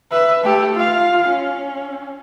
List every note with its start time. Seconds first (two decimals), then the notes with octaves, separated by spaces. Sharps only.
0.11 B4 E5
0.44 A3 G4
0.75 F4 F5
1.28 C#4